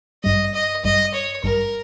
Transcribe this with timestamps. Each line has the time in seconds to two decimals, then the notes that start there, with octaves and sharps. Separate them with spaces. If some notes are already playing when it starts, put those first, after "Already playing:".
0.24 G#1 G2 G3 D#5
0.54 D#5
0.84 G#1 G2 G3 D#5
1.14 C#5
1.43 G#1 G2 G3 A#4